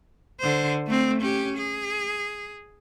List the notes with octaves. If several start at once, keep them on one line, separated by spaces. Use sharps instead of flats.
D3 C5
A3 C4
C#4 G4
G#4